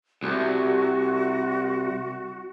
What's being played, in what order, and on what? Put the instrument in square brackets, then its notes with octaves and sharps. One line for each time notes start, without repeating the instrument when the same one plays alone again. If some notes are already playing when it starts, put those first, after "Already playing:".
[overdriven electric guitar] C2 [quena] F#4